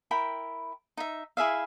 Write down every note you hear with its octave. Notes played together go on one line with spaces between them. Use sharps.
E4 A#4 G5 B5
D#4 E5
E4 G#4 E5 F5